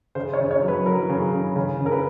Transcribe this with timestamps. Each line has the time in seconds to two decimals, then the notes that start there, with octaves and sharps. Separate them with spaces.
0.15 C#3 C5
0.34 C#5
0.40 C#3
0.51 C#5
0.63 F#3
0.68 B4
0.85 F#3 A#4
1.09 C#3
1.33 C#3
1.56 C#3
1.80 C#3
1.86 A#4
1.92 B4